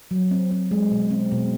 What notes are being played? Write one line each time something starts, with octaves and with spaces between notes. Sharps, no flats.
F#3
C4
C4
G#3
B2
C4
B2